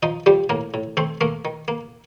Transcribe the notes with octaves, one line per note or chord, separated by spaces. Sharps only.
F3 D#4 D#5
F3 G3 G4
A2 A#3 A#4
A2
A3 C4 C5
A3 A#3 A#4
D#3
A#3